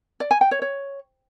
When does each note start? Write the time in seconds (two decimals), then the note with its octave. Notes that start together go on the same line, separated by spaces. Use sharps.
0.20 D5
0.31 G#5
0.41 G5
0.51 C#5
0.62 C#5